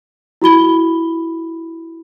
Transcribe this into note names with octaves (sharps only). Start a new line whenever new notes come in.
E4 F#4 B5 G7